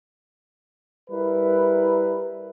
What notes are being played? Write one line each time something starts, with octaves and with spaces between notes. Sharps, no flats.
G3 E4 A#4 B4